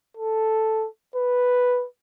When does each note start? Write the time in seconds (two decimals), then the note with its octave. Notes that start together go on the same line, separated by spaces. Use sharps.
0.17 A4
1.16 B4